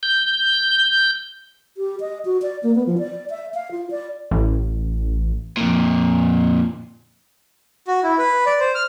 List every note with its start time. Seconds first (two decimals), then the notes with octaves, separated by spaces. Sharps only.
0.03 G6
1.77 G4
2.00 D#5
2.25 F#4
2.42 D5
2.63 A#3
2.75 B3
2.86 F3
2.98 D5
3.30 E5
3.54 F5
3.71 F4
3.91 D5
4.31 A1
5.57 F2 A#2
7.87 F#4
8.04 E4
8.18 B4
8.46 D5
8.60 C5
8.75 F6